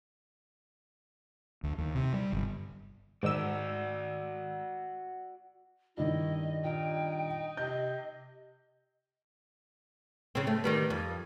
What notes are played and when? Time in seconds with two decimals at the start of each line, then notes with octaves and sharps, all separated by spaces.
1.63 D2
1.78 D#2
1.95 C3
2.13 G3
2.33 G1
3.23 G#2 D#3 F#4 D5 E6
5.97 G2 D#3 E4 D#5
6.63 A#2 D#4 G5
7.57 C3 D#5 G6
10.35 C#3 C4
10.47 A3
10.64 D#3 G3 B3
10.90 F2